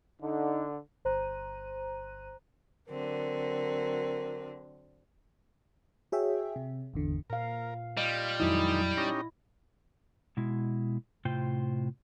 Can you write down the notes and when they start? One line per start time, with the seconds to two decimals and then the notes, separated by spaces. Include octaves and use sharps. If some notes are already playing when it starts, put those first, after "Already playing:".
0.22 D3 D#4
1.05 G1 C5 A#5 F#6 D#7
2.88 D3 F#3 C4 A#4
6.12 F#4 G#4 C#5 E5 G5
6.56 C3
6.94 G#1 E2 D3
7.30 A#2 A#4 F5
7.97 G3 F4 D#5
8.40 F2 D#3 F#3 G#3 D#4 E4
8.97 C#4 D#4 G4 A#6
10.37 B2 G#3 E4
11.25 A2 C3 F4 C5 G5